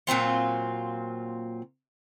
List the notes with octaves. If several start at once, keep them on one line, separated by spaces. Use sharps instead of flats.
A#2 F#3 C4 F4